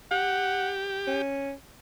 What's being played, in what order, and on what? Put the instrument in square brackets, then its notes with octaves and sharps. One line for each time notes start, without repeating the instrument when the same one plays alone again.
[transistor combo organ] G4 [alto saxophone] F#5
[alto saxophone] C#4